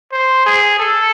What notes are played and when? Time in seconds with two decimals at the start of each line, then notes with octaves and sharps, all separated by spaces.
0.12 C5
0.46 G#4
0.79 A4